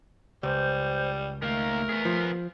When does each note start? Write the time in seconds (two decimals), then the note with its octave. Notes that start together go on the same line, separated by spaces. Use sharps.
0.43 C#2 G3 C5
1.42 D#3 A3 A#3 A#4
1.89 B3 G#4
2.05 F3